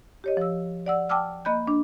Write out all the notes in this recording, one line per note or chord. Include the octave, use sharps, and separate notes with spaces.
G4 C#5 D#5
F3 E6
D5 F#5 E6
G5 A5 D6 E6 F6
A#3 D#5 B5 F#6 G6
D4